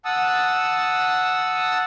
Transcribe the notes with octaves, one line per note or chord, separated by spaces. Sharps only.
F#5 A5 D#6 E6